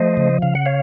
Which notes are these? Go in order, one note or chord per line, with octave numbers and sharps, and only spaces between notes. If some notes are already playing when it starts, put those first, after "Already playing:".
Already playing: F3 A3 C5 D#5
C#3
C#3 F5
F#5
C#5 F5